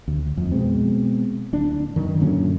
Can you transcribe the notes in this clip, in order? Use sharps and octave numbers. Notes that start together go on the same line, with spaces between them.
D2
F2
B2 G#3 C4
D1 D4
F#2 D#3
F#2 A#2 D3 C#4